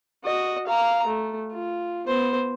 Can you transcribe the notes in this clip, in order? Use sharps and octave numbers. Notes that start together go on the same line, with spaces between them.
F#4 D#5
F5 A#5
A3
F4
B3 C5